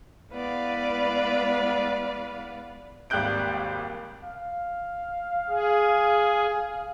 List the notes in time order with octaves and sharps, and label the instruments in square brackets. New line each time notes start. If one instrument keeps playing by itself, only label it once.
[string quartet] G#3 B3 E4 B4 D5 F5
[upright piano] G#1 D#2 G3 F#6 G6 D7
[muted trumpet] F5
[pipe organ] G#4